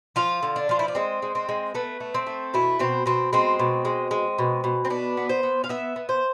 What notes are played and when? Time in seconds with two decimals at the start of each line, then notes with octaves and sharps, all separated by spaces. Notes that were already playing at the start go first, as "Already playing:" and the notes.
0.16 F3 F4
0.43 D3
0.56 D4
0.69 F3 F4
0.79 E4
0.88 D4
0.95 G#3 C4
1.22 G#3
1.35 C4
1.49 G#3
1.75 A3 B3
2.00 A3
2.14 C4
2.27 A3
2.54 B2 E4
2.79 B2 C4
3.06 B2 C4
3.33 G#3 C4
3.59 B2
3.85 G#3
4.11 G#3
4.38 B2
4.64 B2
4.85 C4
4.90 B3 D4
5.17 B3
5.29 C5
5.43 B3
5.64 F5
5.69 B3 E5
5.96 B3
6.09 C5